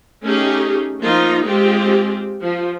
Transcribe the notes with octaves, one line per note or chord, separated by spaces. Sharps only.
A3 C#4 D#4 G4 G#4
F3 A#3 D#4 F4
G#3 C4 F4 G4 G#4
F3